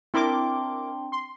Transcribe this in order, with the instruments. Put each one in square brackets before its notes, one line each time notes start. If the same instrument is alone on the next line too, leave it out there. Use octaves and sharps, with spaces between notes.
[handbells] C4 D4 C6 [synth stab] E4 A#4 D6
[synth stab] C6